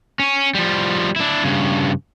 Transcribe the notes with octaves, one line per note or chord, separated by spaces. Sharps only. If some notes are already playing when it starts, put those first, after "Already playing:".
C#4
F3 G3
D4 E4
G2 C#3